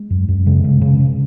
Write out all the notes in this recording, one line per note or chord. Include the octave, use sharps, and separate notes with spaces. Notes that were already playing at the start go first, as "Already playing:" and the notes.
Already playing: G#3
F#2
F#2
C#3 G#3
C#3
C#3
C#3